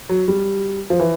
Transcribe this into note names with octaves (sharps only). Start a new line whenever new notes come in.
F#3
G3
F3
E3